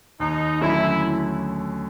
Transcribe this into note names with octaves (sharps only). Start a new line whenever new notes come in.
D#2 D#4
D3 F#3 A3 C#4 E4